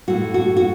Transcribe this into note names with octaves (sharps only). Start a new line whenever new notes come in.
A2 A3 F#4
F#4
F#4